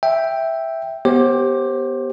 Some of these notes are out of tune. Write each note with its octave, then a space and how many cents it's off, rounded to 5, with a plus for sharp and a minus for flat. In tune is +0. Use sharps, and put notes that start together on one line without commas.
E5 +0 G5 +0
B3 +0 G4 +0 C5 +35